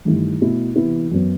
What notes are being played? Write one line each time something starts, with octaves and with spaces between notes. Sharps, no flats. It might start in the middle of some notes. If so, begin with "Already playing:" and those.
G2 D#3 A3 E4
B2 A3 E4
C3 E3 B3 E4
F#2 F#3 B3